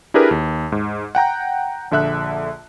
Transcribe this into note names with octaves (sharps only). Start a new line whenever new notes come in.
D4 E4 G4 G#4 A#4 B4
D#2
G#2
F#5 G5 A#5 G6
A#1 D3 E5 F#6